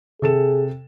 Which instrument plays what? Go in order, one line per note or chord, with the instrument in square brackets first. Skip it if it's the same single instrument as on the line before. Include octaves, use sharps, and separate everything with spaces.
[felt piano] C3 A4 E7 [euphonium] G#4